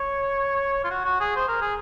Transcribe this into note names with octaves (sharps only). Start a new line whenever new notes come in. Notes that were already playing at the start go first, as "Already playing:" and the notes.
Already playing: C#5
F4
F#4
F#4
G#4
C5
A#4
G#4